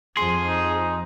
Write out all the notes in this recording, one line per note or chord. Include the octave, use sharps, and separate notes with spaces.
F2 F3 G#4 C6
D#4